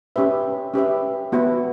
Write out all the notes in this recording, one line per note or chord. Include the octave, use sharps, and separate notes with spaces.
C#4 G4 B4 E5
C#4 G4 B4 E5
B3 F#4 B4 E5